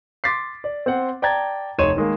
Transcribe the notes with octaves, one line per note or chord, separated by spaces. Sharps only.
C6 D6 A6 B6 C7
D5
C4 C5 F#5
D5 G5 A5 A#5 G#6 A6
F1 D#4 C#5 C6 D#7 E7
D#3 G#3 A#3